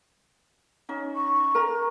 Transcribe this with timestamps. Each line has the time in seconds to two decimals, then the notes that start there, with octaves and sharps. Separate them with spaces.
0.89 C#4 D#4
1.15 C#6
1.55 A#4 A#5